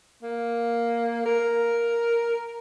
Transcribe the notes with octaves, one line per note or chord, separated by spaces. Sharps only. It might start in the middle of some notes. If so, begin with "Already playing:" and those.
A#3
A#4